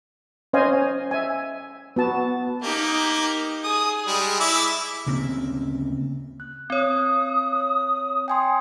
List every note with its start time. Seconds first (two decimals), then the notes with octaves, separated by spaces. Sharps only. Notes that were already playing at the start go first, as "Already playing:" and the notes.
0.53 C#4 C5 D#5 F5 G#5
1.11 E5 G#5
1.96 B3 F#4 A5
2.62 A#3 D#4 G4
3.64 G#4 D#6
4.07 G3 G#3
4.40 E4 D6 E6
5.07 D2 C#3 A#3 C4
6.40 F#6
6.70 C4 C#5 D#6
8.28 G5 G#5 C6